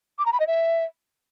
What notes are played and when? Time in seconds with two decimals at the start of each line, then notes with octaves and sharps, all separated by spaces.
0.19 D6
0.26 A#5
0.33 B5
0.40 D#5
0.47 E5